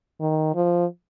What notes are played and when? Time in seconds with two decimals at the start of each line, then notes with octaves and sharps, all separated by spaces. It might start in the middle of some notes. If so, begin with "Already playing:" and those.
0.21 D#3
0.55 F3